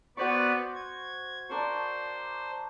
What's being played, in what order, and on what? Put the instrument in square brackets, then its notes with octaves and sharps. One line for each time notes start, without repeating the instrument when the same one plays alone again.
[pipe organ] B3 B4 D5 [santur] F#4 C5 C#6
[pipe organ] G#6
[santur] D4 A#4 C#6 [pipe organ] C5